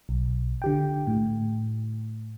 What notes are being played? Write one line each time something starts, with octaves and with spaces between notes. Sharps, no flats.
B1
D3 G4 G5
A2